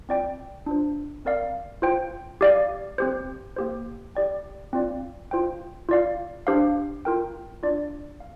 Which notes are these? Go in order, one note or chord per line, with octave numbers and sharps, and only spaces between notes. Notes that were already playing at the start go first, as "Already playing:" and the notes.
C4 F4 D5 G5
D4 F4 C5
C4 A#4 D5 F5
F4 C5 G5
G4 D5 F5
C4 G4 C5
A#3 G4 C5
G4 D5 G5
C4 F4 D5 F5
F4 C5 G5
F4 D5 F5
D4 G4 C5 F5
F4 A#4 G5
D4 F4 D5
F5